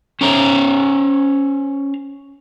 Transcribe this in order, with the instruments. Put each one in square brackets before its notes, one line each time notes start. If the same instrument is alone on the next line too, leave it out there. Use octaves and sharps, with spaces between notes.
[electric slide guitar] C#4 C5 C#5 A#5